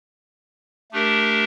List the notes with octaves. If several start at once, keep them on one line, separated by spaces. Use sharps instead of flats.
A3 D4 G4 A#4